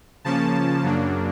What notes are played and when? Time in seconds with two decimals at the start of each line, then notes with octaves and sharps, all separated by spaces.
0.24 C#3 F3 A#3 C#4 A5
0.82 F#2 C#3 F#3 A#3 D4